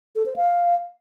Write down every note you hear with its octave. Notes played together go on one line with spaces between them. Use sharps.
A4
C5
F5